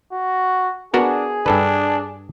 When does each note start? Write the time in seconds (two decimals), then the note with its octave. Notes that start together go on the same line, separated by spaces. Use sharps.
0.12 F#4
0.94 B3 D4 F#4 G#4 A#4
1.46 G2 D4 A4 B4